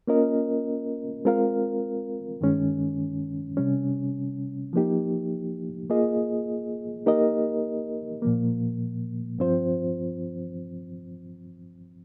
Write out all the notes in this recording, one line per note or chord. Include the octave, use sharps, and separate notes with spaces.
A#3 C#4 F4 A#4 D#5
G#3 C4 F4 A#4 F5
G2 D#3 G#3 C#4
C3 G3 C#4
F3 A#3 D#4 G4
A#3 F4 G#4 D#5
A#3 D#4 G4 A#4 D#5
A#2 F3 A#3
G2 F3 C4 F4 C5